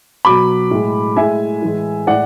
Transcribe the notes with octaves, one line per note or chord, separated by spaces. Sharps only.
B2 F#3 B5 D6
A2 G#3
A2 G#3 E5 G#5
A2 E3 G#3
A2 G#3 D5 F#5